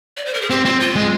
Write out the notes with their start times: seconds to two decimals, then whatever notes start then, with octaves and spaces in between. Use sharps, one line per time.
0.17 D5
0.26 C5
0.34 A#4
0.41 G#4
0.50 C4 G4
0.65 C4 F4
0.80 F4
0.96 G#3